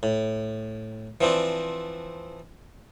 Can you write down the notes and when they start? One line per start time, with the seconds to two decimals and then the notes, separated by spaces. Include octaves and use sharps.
0.03 A2
1.21 E3 F3 C4 D4